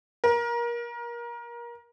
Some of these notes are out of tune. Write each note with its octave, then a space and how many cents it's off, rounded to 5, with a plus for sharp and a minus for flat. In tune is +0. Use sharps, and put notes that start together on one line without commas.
A#4 +25